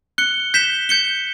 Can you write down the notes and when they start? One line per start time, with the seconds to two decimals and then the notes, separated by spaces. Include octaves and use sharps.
0.18 F#6 C#7 G7
0.54 G6 B6 E7 G7
0.89 G6 C#7 G7